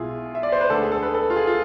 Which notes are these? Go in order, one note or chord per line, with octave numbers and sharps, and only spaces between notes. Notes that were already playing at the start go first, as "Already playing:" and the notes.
Already playing: B1 B2 G#3 B3 E4 F4 G#4
E5
D5
C5
B4
D2 D3 G#3 A4
G#4
A4
B4
A4
F4
G#4
F4